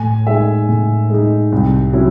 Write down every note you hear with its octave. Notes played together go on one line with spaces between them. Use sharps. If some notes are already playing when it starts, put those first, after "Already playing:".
Already playing: A2 G#5
G#3 D#4 E5
A2
G#3 D#4
C2
C3 F#3 C#4 E4